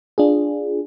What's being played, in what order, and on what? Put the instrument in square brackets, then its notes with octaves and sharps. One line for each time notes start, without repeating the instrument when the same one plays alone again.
[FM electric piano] D4 F4 G#4